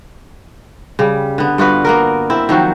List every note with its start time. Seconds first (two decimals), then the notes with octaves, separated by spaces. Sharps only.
0.99 C#3 G3
1.38 D3 B3
1.58 G2 F4 F#4 B4
1.85 A#3 B3 A#4
2.30 C4 E4
2.49 D#3 F3 F#3 F#4